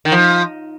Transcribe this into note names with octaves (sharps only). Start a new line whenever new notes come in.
D#3
F3